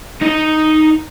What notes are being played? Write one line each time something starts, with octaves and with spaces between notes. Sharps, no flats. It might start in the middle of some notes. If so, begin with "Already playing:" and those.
D#4 D#5